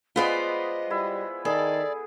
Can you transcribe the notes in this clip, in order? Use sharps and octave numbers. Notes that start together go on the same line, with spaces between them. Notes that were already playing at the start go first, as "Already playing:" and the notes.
G#3 B3 F4 B4 C5 D5 D#5
G3 E4
D#3 G#4 A4 D5